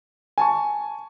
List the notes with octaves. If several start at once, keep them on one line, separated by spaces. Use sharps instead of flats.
G#5 A5 C#6